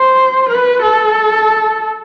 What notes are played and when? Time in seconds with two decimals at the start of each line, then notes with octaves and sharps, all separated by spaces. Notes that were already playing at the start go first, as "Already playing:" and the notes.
Already playing: C5
0.48 B4
0.82 A4